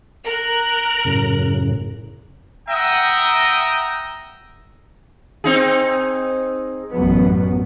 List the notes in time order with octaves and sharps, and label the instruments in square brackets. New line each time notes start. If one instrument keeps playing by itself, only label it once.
[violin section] A#4 F#6
[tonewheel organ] F#2 A2 C#3
[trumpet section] E5 F#5 G5 A#5 D#6
[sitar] C4 D#4 G#4
[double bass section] A1 F#2 B3